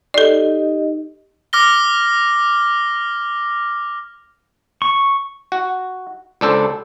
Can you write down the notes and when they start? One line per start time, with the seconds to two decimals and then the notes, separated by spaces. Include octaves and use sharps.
0.14 D#4 G4 A4 D5 D#5
1.53 D6 F6 A#6 G7
4.82 C#6
5.52 F#4
6.41 C#2 D4 A4 C5